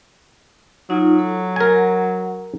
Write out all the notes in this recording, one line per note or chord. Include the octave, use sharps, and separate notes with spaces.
F#3 D#4 F4
A4
A#4 F#5 G#5